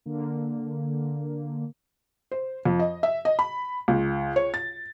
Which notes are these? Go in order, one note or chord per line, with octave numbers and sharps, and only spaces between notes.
D3 A#3
C5
F2
D#5
E5
D#5
B5
C#2
C#5
A6